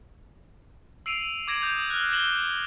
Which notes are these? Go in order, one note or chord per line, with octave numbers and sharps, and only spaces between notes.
E6 C7 D7 D#7 F7
D6 G#6 A#6 D7 F#7
D#6 G6 F7
F6 F#6
F#6 A#6 E7 F#7 G7